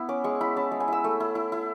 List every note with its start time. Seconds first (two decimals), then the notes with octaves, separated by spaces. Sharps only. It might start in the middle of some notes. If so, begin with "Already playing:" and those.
Already playing: B3 E4
0.09 C#4 D6
0.24 G#3 C#6
0.41 E4 B5
0.56 C#4 A5
0.72 G#3
0.80 G#5
0.88 E4 E6
1.04 A3
1.20 E4
1.35 E4
1.52 E4